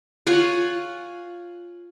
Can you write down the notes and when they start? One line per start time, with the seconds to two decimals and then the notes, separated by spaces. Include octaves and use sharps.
0.27 F4 C#5 F#5 G#5